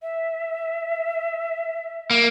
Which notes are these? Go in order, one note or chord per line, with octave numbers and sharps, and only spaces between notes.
E5
A#3